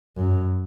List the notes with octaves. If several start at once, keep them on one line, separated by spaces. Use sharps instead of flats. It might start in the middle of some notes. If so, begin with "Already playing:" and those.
F#2